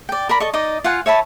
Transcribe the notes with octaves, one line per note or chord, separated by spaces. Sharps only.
D5 G5
A#4 D5 B5
A4 D#5 C#6
D#4 D5 D#5
F4 F5 F#5 G#5
C#5 E5 A5 B5